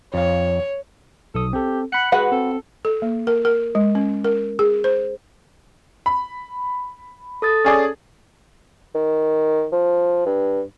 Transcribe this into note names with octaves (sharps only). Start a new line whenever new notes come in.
F2 C#5 F5
B1 A4 D#6
C4 G4 A4
F#5 B5 C#7
G#3 F#4 B4 F#5
C4 A4
A4
A#3
A#4
A#4
G#3
C#4
A#4
G#4
C5
B5
A4 D#6 A6
C#4 G#4 D5
D#3
F3
G2